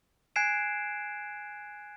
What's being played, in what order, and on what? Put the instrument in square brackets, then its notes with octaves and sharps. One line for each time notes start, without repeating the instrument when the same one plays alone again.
[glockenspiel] G#5 F#6 G#6 C7 D7 E7